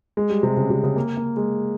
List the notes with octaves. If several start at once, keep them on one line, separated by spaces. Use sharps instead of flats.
G#3
G3
C3
C#3
C3
C#3
A#3
A#3
G#3